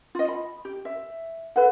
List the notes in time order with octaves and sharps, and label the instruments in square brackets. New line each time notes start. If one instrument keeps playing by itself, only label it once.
[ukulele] F4 D#5
B5
G4
E5
A4 B4 F#5